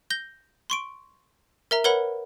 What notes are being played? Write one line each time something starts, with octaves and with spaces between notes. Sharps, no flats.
G6 A#6 G7
C6 C#6 D7
A#4 E5 A#5
A#4 B4 C#5 F#5 B5